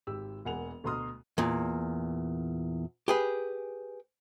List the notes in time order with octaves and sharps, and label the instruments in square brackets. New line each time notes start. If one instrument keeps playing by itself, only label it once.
[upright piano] G#1 G4 E6
E1 A#3 F#5 G#5 F7
D2 B2 A#5 C6 D#6 F6
[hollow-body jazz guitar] E2 A#2
G4 G#4 B4